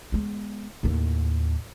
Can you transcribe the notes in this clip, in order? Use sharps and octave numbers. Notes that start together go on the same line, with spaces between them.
G#3 B3
D#2 A2